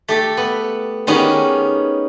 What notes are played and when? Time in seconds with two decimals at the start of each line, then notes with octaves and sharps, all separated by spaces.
0.08 A3 G4 A4
0.37 B3
1.07 D#3 B3 C#4 D#4 G4 G#4